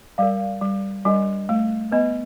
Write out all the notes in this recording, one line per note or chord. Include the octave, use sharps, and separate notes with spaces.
G3 A#4 D5 F5
G3
G3 D4 F#4 A#4 D#5 G#5
A3
B3 B4 D#5 G#5 B5